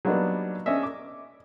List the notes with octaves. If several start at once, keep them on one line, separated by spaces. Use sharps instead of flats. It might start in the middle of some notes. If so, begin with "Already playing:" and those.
F#3 G3 A#3 B3 D4 D#4
C#4 D4 D#5 E5
D6